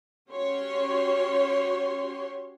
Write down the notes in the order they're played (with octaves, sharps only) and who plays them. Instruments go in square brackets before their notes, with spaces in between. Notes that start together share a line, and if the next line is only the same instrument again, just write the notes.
[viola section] C#4 F#4 G4 C#5 C6